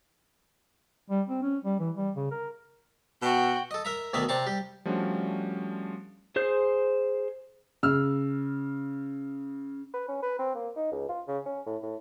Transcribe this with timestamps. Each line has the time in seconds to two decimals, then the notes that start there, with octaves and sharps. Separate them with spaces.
1.10 G3
1.29 C4
1.42 C#4
1.65 G3
1.80 E3
1.96 G3
2.16 C#3
2.31 A#4
3.22 B2 F#4 G5
3.71 A4 D#5
3.85 A#4 E5 A#5
4.13 D2 B2 D#3 A#4 D5 E5
4.29 C3 C4 D5 A5 A#5 C#6
4.46 G3 G4
4.85 F3 G3 A3 C#4 D4 F#4
6.36 G#4 C5 G6
7.83 C#3 E6 F6
9.94 B4
10.09 C#4
10.23 B4
10.39 C4
10.55 A#3
10.76 D#4
10.92 C#2
11.09 F4
11.28 C#3
11.46 C#4
11.67 A2
11.83 A2